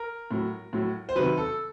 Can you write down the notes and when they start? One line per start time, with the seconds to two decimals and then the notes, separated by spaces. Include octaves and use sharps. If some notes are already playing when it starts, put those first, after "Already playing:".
Already playing: A#4
0.31 A2 F#3
0.73 A2 F#3
1.09 C5
1.15 C3 D#3 F#3 B4
1.37 A4